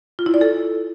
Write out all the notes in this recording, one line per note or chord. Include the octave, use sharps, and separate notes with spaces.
F4
E4
D5
A4